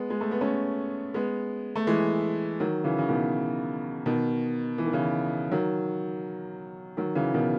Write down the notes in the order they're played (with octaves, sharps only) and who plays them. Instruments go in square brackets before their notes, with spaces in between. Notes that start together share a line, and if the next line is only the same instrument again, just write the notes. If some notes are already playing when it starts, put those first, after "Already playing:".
Already playing: [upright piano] G#3 B3
G#3
A3
B3
A3 C#4
G#3 B3
A3
E3 G#3
D#3 F#3
C#3 E3
C#3
B2 D#3
B2 D#3
E3
D#3
C#3 E3
D#3 F#3
D#3 F#3
C#3 E3
B2 D#3